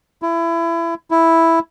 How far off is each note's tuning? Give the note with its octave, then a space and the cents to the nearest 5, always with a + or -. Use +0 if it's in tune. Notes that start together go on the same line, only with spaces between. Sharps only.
E4 +25
E4 +0